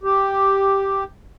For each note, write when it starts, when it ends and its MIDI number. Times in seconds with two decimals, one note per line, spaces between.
0.03 1.04 67